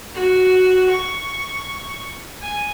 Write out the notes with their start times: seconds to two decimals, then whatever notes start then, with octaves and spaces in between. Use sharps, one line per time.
0.14 F#4
0.90 C#6
2.42 G#5